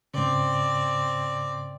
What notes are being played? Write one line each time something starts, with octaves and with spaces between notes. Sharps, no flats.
G#2 C#3 C4 D5